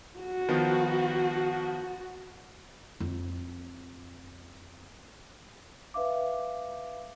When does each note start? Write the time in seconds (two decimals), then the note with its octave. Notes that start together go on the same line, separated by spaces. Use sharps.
0.19 F#4
0.49 D#3 F3 B3
3.00 F2 F4
5.94 B4 E5 F5 D6